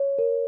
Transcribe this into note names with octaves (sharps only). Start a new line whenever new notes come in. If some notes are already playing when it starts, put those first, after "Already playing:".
Already playing: C#5
A#4